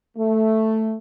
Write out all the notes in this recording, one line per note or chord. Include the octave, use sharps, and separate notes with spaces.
A3